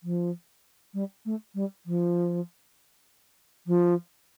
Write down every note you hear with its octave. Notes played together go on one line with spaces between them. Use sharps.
F3
G3
A3
G3
F3
F3